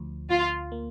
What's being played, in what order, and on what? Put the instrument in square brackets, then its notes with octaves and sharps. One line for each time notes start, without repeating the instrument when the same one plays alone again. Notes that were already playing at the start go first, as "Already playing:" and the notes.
Already playing: [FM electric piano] D2 F3
[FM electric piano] D2 [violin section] F4
[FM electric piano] A#3